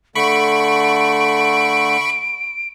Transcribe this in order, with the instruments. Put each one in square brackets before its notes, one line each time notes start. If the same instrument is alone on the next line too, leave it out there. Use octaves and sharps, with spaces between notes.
[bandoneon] D3 A3 [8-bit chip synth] B5 C#6 [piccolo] D7